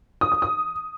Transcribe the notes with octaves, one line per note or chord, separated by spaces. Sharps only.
D#6
D#6
D#6